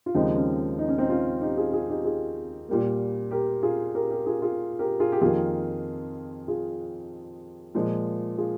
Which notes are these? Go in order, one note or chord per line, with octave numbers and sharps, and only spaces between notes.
F4
D#2 C#3 F3 G#3 C4 D#4
C#4
D#4
C#4
C4 D#4
C#4 F4
D#4 G4
F4 G#4
F4 G#4
D#4 G4
F4 G#4
A#2 G3 A#3
G4 A#4
F4 G#4
G4 A#4
G4 A#4
F4 G#4
F4 G#4
G4 A#4
F4 G#4
G4
F2 D#3 A#3 F4 G#4
F4 G#4
A#2 F3 G#3
F4 G#4